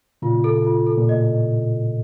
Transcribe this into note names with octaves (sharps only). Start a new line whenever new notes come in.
A#2 C#3 F4
A4
F4
A4
A#2
A2 D#5